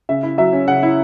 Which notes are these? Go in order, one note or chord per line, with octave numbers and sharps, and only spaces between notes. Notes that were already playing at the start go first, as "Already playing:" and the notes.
C#3 E5
E4
F#3 E5
C#4
C#3 F#5
E4